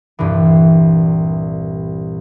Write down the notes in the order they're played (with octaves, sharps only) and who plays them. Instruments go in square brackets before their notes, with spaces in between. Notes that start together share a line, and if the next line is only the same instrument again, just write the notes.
[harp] C2 G2 A#2 E3